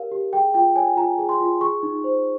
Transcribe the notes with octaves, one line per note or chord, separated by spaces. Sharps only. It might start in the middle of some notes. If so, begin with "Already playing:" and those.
Already playing: G4 A#4 C#5 F5
G4
G#4 G5
F4 G5
C#5 G#5
F4 A#5
G#4
C6
F4
G#4 C#6
D#4
C5